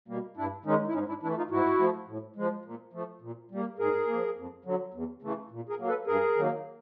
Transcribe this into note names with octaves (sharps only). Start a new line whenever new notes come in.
B2 G3 A#3
G2 D4 E4
D#3 G#3 C#4 D#4
E4
G#2 C#4 D#4
D4 E4
E3 A3 D4 E4
D#4 F4
G#2 E4 F#4
F3 A3
A2
F3 G#3
A#2
F3 A3
A#2
G3 A#3
G#2 G#4 A#4
A#3
F3
F2
D3 F#3
E2
C#3 E3 A3
A#2
G#4 A#4
F#3 A#3
A4 B4
G2 G#4 A#4
D#3 F#3 A#3